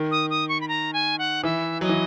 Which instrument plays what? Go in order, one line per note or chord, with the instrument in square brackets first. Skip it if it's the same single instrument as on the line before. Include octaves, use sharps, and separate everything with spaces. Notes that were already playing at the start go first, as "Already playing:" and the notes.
Already playing: [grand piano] D#3
[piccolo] D#6
D#6
C#6
B5
A#5
G#5
F#5
[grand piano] E3 [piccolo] E5
[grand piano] F#3 [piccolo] D#5
[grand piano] E3